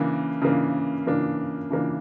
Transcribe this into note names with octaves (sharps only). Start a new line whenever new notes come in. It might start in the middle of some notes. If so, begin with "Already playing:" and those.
Already playing: C#3 E3 A#3 D4
C#3 E3 A#3 D4
C#3 E3 A#3 D4
C#3 E3 A#3 D4